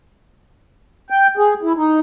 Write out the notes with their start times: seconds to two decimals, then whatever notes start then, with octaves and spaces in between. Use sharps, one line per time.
1.10 G5
1.37 G#4
1.63 E4
1.77 D#4